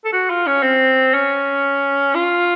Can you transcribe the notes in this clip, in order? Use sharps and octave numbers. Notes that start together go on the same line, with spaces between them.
A4
F#4
F4
C#4
C4
C#4
F4